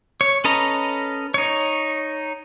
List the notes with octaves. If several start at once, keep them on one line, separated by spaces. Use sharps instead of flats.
C#5
C#4 A4 B4 D#5 A#5
D#4 C#5